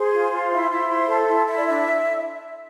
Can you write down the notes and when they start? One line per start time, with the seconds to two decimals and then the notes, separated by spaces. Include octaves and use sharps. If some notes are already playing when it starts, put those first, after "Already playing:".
Already playing: G#4 C5 C6
0.12 F4
0.31 F4
0.51 E4
0.70 E4
0.89 C5
1.08 A4
1.27 E4
1.47 E4
1.57 D5
1.66 D4 E5